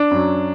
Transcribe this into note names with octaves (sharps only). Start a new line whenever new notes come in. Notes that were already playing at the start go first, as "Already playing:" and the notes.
Already playing: D4
F#2 F#3